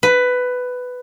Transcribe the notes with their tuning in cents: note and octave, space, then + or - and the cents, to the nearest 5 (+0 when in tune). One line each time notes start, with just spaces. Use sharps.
B4 +10